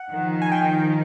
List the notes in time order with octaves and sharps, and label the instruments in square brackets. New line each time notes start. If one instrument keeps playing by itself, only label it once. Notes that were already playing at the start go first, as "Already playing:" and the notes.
Already playing: [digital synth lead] F#5
[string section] D#3 F3
[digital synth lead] G#5
G5